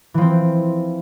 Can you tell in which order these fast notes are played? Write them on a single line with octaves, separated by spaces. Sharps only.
E3 F3 C4